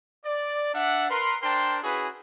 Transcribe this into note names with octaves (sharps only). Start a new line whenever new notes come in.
D5
D4 E5 F#5
A#4 B4 C6
D4 A#4 C5 G5 A5 C6
C#4 E4 F#4 G#4 B4